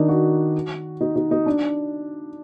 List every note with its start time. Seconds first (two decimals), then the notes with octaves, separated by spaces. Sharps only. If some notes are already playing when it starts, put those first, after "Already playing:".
Already playing: D#3 D4 D#4
0.09 F#4
1.01 D#4
1.16 D#4
1.31 D#4
1.46 D4